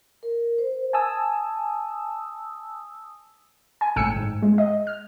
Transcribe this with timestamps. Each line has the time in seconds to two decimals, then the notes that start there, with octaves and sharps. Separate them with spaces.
0.23 A#4
0.58 C5
0.93 G#5 A5 D#6 E6
3.81 G#5
3.96 G#1 A2 G5 G#5 E6 C#7
4.16 G#2
4.42 G#3
4.58 D#5
4.87 F6